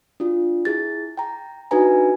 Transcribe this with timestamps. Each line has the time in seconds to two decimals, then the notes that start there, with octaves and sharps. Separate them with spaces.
0.20 D4 F4
0.65 E4 G#4 A6
1.17 G5 A#5
1.71 D4 D#4 F#4 B4 G#5 A#5